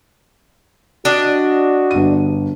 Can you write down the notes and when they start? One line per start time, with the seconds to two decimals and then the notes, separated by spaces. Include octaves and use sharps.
1.05 D4 F#4 D#5
1.91 G1 D#7